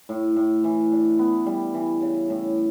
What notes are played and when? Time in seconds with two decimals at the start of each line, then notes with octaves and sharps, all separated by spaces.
0.09 A2
0.36 A2
0.64 E3
0.92 D4
1.19 B3
1.46 G3
1.74 E3
2.02 C#3
2.30 A2